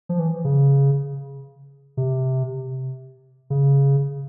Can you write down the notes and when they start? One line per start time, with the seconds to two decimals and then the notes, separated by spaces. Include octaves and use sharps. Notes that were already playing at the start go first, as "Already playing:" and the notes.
0.09 F3
0.19 E3
0.45 C#3
1.97 C3
3.50 C#3